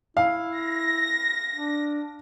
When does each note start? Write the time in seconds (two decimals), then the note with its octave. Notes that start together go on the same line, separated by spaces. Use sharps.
0.17 E4 F5
0.57 A#6
1.55 D4